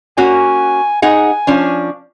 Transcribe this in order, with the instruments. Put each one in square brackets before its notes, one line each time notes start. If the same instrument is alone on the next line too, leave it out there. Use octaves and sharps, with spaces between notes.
[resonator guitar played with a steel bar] A#3 C#4 F#4 [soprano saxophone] G#5
[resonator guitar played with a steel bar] D#4 G#4 F#5 [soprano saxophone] G#5
[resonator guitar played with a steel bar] F3 C#4 D4